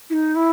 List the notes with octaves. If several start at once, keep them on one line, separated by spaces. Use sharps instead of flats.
E4
D#4
E4